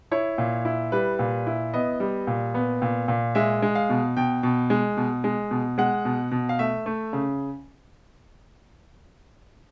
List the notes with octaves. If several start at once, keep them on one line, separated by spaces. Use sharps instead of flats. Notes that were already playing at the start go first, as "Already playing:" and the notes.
E4 C#5
A#2
E4
G3 B4
A#2
E4
B3 D#5
G3
A#2
B3
A#2
A#2
G#3 E5
G#3
F5
B2
B2 G5
B2
G#3
B2
G#3
B2
G#3 F#5
B2
B2
F5
A3 E5
A3
C#3